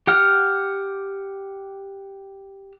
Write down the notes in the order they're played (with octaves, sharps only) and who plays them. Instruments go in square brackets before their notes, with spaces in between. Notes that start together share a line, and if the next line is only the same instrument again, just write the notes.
[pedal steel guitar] G4 F#5 F6